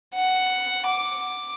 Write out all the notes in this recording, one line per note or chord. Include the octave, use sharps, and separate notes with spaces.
F#5
D6